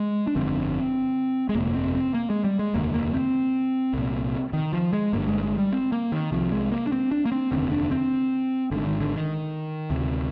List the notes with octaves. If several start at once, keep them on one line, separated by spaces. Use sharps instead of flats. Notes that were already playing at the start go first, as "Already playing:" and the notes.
Already playing: G#3
D4
G1 F2 D3 C4
G#3
G1 F2 C3 A#3
C4
C4
A#3
G#3
G3
G#3
F1 D#2 D3 A#3
A#3
C4
C2 A#2
D#3
F3
G#3
G1 G2 D3 A#3
G#3
G#3
G3
C4
A#3
D#3
C2 C3 F3
G#3
A#3
D4
C4
D4
A#3
C4
F1 D#2 D3 C4
D4
C4
G#1 G#2 D3
D#3
D3
D#3
D2 C3